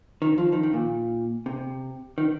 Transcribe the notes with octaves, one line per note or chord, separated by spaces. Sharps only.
D#3
F3
D#3
D#3
A#2
C3
D#3